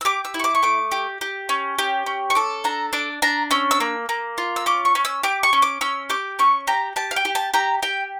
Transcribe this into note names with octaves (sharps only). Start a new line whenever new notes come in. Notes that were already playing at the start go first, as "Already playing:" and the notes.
E6
G4 D6
E6
E4
C#6
D6
C#6
A3 D6
G4
G4
C#4
G4
C#4
C#6
A4 D6
D4 A#5
D4 D6
D4 A#5
C#4 E6
E6
A#3
A#3
F4
E6
C#4 D6
C#6
C#4
E6
G4 D6
C#6
C#4
D6
C#4 E6
G4 D6
C#4 C#6
G4 A#5
G4 A5
F5
G5
G4
A5
G4 A#5
G4 G5